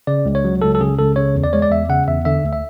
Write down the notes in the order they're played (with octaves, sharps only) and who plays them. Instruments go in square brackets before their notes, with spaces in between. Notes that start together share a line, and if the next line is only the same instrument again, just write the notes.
[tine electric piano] C#3 D5
C#2
C#5
F#3
C#2 A4
A4
C#3 G#4
C#2 A4
C#3 C#5
E2
D5
G#3 C#5
D5
E2 E5
C#3 F#5
E2 E5
D3 E5
D2
E5